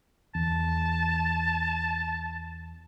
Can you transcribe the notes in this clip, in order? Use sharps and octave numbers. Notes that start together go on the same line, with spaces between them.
E2 A5